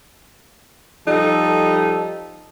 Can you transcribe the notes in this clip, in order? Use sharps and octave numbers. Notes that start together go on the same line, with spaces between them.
F3 G3 D#4 A4